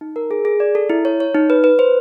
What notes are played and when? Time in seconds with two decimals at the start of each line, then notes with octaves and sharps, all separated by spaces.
0.01 D#4
0.16 A#4
0.31 G#4
0.45 G#4
0.60 D5
0.75 A4
0.90 E4
1.05 C#5
1.20 C#5
1.35 D#4
1.50 B4
1.64 B4
1.79 C5